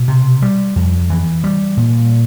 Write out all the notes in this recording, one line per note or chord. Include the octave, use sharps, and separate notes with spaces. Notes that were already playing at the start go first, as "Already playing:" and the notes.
Already playing: B2
C3
G3
F2
E3
G3
A#2